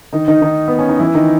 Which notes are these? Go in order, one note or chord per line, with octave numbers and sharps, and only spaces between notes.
D#3 D#4
D#3 D#4
D#3 D#4
B3
C#4
D#4
E3 E4
D#3 D#4